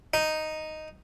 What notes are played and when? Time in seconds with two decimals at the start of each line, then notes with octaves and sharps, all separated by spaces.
0.14 D#4